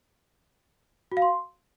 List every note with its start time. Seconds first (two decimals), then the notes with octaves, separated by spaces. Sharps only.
1.12 F#4
1.17 F5
1.22 C6